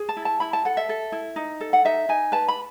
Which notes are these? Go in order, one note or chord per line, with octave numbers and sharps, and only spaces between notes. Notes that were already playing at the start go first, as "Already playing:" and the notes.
Already playing: G#4
A5
E4
A5
E4 B5
A5
A4 F#5
E5
A4
E4
D#4
A4
F#5
D#4 E5
D#4 G#5
B4 A5
B5